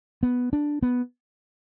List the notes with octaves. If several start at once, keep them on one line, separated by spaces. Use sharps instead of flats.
B3
D4
B3